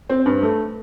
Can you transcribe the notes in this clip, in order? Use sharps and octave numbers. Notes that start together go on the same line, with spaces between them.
C4
G2
A3